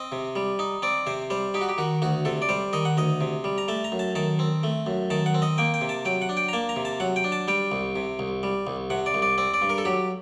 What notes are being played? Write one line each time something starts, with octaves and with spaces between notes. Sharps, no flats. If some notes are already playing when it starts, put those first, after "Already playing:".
Already playing: C4 D#5
C3
G3
D#4
C4 D5
C3 C5
G3 C5
D#4 G4
F#4
G4
D#3 F#4
D2 F#4
C3 A4
D5
G3 C5
D#3 D#5
F#5
D2 D#5
C3
G3
A#5
A3 A5
A#5
F#2
A5
D#3 A5
C4
A3
F#2
D#3 A5
F#5
C4
D#5
A#3 G5
G5
C3
A5
F#3 G5
F#5
D4
G5
A#5
A#3 A5
A#5
C3
A5
F#3 F#5
G5
D4
A5
G3 G5
C2
C3
C2
G3
C2
C3 F#5
D5
C2
D5
C4 D5
D5
G2
A#4
A4
F#3 G4